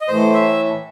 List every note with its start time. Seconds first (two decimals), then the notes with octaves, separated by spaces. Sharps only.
0.01 D#5
0.08 A2 E3 A3 C5
0.34 E5